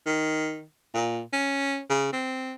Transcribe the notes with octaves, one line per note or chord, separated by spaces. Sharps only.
D#3
A#2
C#4
C#3
C4